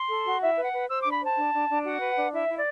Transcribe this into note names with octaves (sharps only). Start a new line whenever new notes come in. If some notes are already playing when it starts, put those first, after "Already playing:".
Already playing: C6
A4
F#4
E4 E5
B4
F#5
B4
C5 E6
D4 D6
B5
C5 A5
D4
D4
D4
F#4 F#5
B4
D4
E4 E5
E4
D5